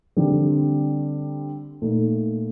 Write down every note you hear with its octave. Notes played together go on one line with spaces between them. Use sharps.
D3 G3 C4
A#2 A3 D#4